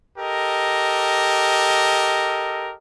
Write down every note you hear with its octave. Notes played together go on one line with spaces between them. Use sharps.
G4 A4 A#4 D#5